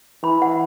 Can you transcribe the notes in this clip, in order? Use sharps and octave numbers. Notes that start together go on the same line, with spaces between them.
E3 B5
F#5